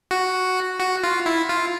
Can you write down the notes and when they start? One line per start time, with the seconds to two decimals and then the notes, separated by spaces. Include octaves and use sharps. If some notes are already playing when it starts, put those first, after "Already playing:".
0.11 F#4
0.80 F#4
1.04 F4
1.26 E4
1.49 F4